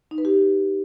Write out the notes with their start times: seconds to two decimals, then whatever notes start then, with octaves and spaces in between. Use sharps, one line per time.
0.11 D#4
0.18 B4
0.25 G4